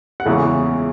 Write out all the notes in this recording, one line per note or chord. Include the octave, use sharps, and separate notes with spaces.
F#5
E2 C#3 E3 G#3 E5